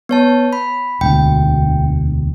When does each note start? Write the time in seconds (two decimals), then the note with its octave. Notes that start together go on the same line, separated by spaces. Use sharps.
0.09 B3 C#5 A5
0.53 B5
1.01 E1 D2 G5